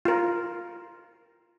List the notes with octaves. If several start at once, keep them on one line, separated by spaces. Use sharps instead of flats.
F4 A#4